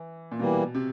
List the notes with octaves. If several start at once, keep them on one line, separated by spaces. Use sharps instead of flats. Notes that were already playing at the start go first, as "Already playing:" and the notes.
Already playing: E3
A#2
B2 E3 G3 A#3
C3